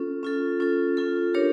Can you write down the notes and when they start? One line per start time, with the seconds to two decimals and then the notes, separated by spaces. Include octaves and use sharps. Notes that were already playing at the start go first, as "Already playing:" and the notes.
Already playing: C#4 F4 A4
0.23 C#4 F4 A4
0.60 C#4 F4 A4
0.97 C#4 F4 A4
1.34 D4 G4 A#4 C#5